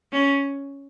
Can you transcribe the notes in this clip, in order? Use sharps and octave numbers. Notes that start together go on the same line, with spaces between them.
C#4